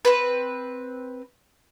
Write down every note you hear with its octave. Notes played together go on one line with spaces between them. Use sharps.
C4 B4